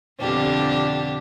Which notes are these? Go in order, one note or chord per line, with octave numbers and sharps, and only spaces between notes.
F2 B2 D3 D4 G4